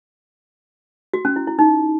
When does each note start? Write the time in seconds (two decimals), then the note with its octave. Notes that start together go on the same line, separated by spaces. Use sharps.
1.14 F#4
1.25 C#4
1.36 E4
1.47 E4
1.59 D#4